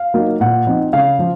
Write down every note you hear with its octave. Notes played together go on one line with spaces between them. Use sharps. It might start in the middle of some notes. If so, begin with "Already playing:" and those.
Already playing: F5
F#3 A#3 D#4
A#2 F#5
F3 C4 D#4
C#3 F5
F3